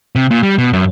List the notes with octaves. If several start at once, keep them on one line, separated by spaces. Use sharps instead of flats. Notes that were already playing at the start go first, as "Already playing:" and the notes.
C3
A#2
G3
B2
F#2